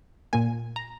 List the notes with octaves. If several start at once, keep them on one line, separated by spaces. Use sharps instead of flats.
A#2 A#3 G#5
A#5